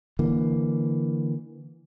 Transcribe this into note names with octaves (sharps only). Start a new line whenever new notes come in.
D3 E3 A#3